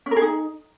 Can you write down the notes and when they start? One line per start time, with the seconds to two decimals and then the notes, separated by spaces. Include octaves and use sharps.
0.06 C#4
0.11 A#4
0.16 G#4
0.22 D#4